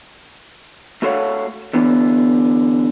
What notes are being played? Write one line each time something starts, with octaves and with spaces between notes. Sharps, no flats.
A3 F#4 A4 C#5 F5 F#5
D3 E3 B3